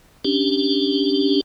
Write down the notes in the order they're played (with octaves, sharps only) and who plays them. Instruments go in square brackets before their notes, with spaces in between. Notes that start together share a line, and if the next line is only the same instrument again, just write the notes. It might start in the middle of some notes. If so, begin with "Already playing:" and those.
[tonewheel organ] C#4 D4 G4